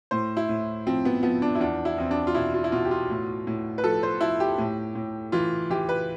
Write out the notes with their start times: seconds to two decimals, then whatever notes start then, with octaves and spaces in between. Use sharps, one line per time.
0.11 A2 C5
0.37 E4
0.49 A2
0.87 F3 C4
1.05 B3
1.23 F3 B3
1.42 D4
1.55 E4
1.60 E2 D4
1.85 E4
1.98 E2 C4
2.11 D4
2.27 F4
2.35 B2 E4
2.54 F4
2.64 E4
2.72 B2 F4
2.85 G4
2.91 F4
3.10 A2
3.47 A2
3.78 B4
3.84 F3 A4
4.03 C5
4.21 F3 E4
4.40 G4
4.58 A2
4.95 A2
5.32 E3 F4
5.70 E3 G4
5.89 B4